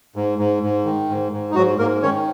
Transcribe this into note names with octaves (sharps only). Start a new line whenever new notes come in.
G#2
G#2
G#2
D#3
G#2
G#2
D#4
G#2 F#3 F#4
G#2 A#3 A#4
D#3 C#4 C#5